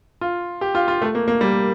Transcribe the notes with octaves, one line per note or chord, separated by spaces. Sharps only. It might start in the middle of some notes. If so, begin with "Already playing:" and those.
F4
G4
F4
F4
A3
A#3
A#3
G3